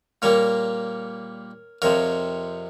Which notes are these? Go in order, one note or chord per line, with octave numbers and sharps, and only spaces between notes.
A#2 G3 A#3 A#4 C#5
F2 C3 F3 A#4 C#5